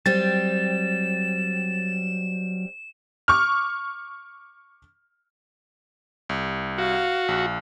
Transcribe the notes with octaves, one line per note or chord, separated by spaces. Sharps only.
F#3 G3 C4 A6 E7
C#6 D6 F6
C2
F#4 F5
A#1